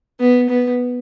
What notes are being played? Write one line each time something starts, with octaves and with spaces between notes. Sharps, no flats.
B3
B3